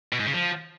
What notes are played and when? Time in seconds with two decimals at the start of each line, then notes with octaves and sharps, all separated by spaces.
0.13 B2
0.20 G#2
0.26 C#3
0.33 F3